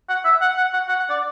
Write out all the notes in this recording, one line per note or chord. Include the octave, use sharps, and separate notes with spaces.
F#5
E5
F#5
F#5
F#5
F#5
F#5
D5